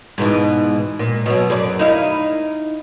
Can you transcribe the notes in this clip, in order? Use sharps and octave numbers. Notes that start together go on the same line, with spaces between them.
G#2 B2 E3
A#2
B2 F#3
F#2 D5
D#4 E4 F5